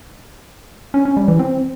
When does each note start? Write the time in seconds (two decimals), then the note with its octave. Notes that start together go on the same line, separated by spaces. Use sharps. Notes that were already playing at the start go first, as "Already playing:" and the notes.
0.94 C#4
1.05 C#4
1.17 G3
1.28 E3
1.39 C4